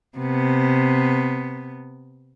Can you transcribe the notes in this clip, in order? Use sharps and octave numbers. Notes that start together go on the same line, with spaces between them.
C3 B3